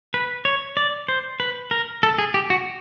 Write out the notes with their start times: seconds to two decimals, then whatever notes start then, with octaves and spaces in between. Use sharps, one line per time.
0.14 B4
0.45 C#5
0.77 D5
1.08 C5
1.40 B4
1.71 A#4
2.03 A4
2.18 G#4
2.34 G4
2.50 F#4